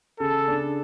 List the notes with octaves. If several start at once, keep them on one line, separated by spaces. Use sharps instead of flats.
C#3 A4
D4